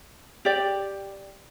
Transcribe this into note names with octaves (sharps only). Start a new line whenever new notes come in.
G4 D5